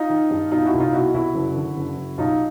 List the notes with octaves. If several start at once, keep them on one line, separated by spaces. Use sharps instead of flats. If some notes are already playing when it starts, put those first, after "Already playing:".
Already playing: D#4 F4
D#3
G2
B2 D#4 F4
E4 F#4
C2
D#4 F4
B2 E4 F#4
C2 E4 F#4
F#1
D3
F#1
F#1
B1 D#4 F4